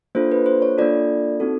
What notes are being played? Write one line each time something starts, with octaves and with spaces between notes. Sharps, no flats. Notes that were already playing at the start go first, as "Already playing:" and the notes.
A#3 D4 F4 A4 C5
B4
C5
C#5
A#3 D4 F4 A4 D5
C4 D#4 F#4 A4